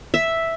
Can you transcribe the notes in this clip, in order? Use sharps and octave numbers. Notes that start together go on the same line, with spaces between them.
E5